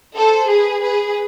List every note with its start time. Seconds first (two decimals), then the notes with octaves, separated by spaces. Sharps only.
0.16 A4 C5
0.48 G#4 B4
0.82 G#4 B4